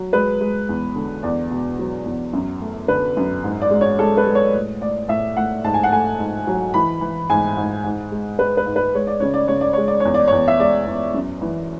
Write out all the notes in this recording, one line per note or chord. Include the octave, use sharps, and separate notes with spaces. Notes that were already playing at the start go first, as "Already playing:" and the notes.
Already playing: F#3
G#3 B4
G#3
E2
D3
E2 D5
B2
F#3
E2
F#2
A3
D3 B4
F#2
G#2
D5
G#3
C#5
G#3 A4
B4
G#3
C#5
A2
A2 D5
A2 E5
A2 F#5
G#2 A5
G#5
F#5
A3 G#5
G#2
F#3
E3 B5
E3
G#2 G#5
G#2
G#2
G#3
G#3 B4
B4
G#2
B4
G#3 C#5
D5
C#3 C#5
D5
C#3 C#5
D5
G#3 C#5
D5
E2 C#5
D5
E2 C#5
E5
G#3 D5
E2
F#2
E3